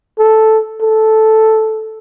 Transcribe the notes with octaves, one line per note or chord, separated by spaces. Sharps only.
A4
A4